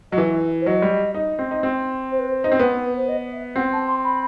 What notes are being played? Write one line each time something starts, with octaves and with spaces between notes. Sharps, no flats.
F#3 D#5
E3 E5
C5
F#3 D#5
G3
D#4
C4
D#4
C4
C5
B4
C5
D#4
C4
B3
B4
C5
D#5
E5
C4 F#5
A5
C6
B5